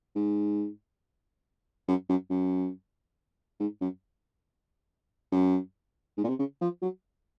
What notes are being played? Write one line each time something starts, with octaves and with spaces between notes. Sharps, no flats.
G#2
F#2
F#2
F#2
G#2
F#2
F#2
G#2
A#2
C3
C#3
F3
F#3